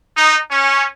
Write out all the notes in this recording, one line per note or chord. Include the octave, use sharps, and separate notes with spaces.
D#4
C#4